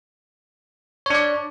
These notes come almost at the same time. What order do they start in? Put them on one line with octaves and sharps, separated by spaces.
C#5 D4 D5